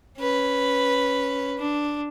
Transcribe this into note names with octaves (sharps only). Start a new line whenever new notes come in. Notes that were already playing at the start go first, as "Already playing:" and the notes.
C#4 B4
D4